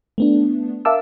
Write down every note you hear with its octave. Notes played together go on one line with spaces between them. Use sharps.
A3 B3 D4
A#4 E5 F5 A5 D6 E6